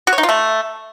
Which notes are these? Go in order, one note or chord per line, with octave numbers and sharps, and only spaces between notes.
F#4
C#5
D#4
F4
A3